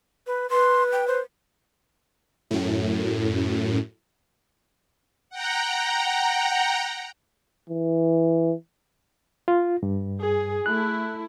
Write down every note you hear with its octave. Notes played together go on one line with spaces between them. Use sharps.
B4
B4 C6
G5
C5
F#2 A2
F#5 G5 A#5
E3
F4
G2
G#4
A3 E4 F#6